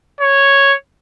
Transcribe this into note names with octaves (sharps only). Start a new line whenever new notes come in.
C#5